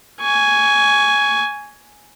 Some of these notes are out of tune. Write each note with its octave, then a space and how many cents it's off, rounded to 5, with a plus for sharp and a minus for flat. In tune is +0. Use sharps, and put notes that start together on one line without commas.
G#5 +0 C#6 +25